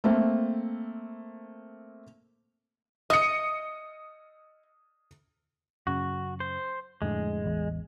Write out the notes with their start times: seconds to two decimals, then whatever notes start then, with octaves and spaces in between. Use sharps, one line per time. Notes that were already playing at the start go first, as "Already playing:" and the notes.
0.04 A3 A#3 C4
3.10 D#5 D#6 C#7
5.87 F#2 C#3 F#4
6.40 C5
7.02 F2 A2 D3 G#3
7.44 A1 E2